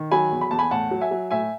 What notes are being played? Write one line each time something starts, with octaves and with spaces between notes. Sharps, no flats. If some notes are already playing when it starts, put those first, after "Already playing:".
Already playing: D#3
F#3 G#5 B5
E2
B5
E2 A5
G#5 B5
A2 F#5 A5
F#3
E5 G#5
F#3
A2 E5 G#5